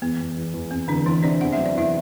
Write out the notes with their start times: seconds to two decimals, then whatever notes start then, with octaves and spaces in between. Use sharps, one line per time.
0.02 E2 B3
0.20 E2
0.37 E2
0.54 E2
0.71 E2 C4
0.88 E2 D3 D4
1.06 E2 E3 E4
1.22 C3 D4 D5
1.41 E2 F#5
1.53 F#3 E5
1.66 D5
1.75 E2 E4 E5